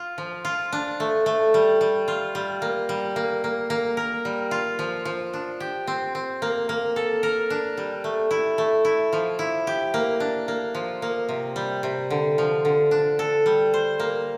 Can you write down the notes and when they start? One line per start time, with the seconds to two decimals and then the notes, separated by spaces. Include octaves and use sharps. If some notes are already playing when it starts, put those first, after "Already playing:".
Already playing: F4
0.18 F3
0.45 F4
0.72 D4
1.00 A3
1.26 A3
1.54 G3
1.81 G3
2.08 F4
2.35 G3
2.62 A#3
2.89 G3
3.16 A#3
3.44 A#3
3.70 A#3
3.97 A#4
4.25 G3
4.51 F4
4.79 F3
5.05 F3
5.33 D4
5.60 G4
5.87 C4
6.15 C4
6.42 A#3
6.69 A#3
6.96 A4
7.23 A#4
7.50 D4
7.77 G3
8.04 A3
8.31 E4
8.58 A3
8.85 E4
9.13 F3
9.39 E4
9.67 G4
9.94 A#3
10.20 D4
10.48 A#3
10.75 F3
11.02 A#3
11.29 C3
11.56 G3
11.83 C3
12.10 D3
12.38 F3
12.65 D3
12.91 D4
13.19 A4
13.46 G3
13.74 C5
14.00 A#3